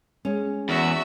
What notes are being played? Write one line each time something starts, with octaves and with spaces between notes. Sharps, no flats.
G#3 C#4
E2 F#4 E5